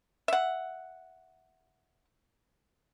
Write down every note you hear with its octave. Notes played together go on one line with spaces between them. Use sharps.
E5 F#5